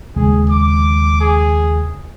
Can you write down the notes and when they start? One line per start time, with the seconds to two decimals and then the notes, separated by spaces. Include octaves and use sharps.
0.16 D#2 C#3 G#3 G#4
0.50 D6
1.21 G#4